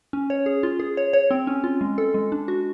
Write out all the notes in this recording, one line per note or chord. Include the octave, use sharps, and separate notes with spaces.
C#4
C#5
G#4
F4
G#4
C#5
C#5
C4
C#4
F4
G#3
A4
G#3
D4
F#4